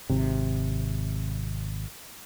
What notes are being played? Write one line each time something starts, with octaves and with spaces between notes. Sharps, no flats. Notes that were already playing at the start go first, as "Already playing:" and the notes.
G#1 C3